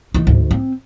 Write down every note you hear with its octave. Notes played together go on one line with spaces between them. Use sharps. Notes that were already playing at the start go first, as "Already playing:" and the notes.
E3 D#4
D2 G#2
C4